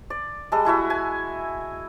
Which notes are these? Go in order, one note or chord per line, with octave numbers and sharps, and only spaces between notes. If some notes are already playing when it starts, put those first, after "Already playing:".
D5
G3 G#3 A4 D#5
G#3 E4 F#4 E5
G#5